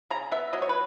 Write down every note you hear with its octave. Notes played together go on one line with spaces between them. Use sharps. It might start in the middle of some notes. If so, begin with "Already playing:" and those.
C#3 A#5
B3 E5
F#3 D#5
C#5
B4